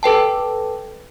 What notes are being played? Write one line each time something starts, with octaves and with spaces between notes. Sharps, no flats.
A4 B4 G5 A5